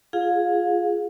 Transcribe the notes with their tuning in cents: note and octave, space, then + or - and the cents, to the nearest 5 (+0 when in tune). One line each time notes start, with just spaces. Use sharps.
F4 -5 G#4 +0 F5 +30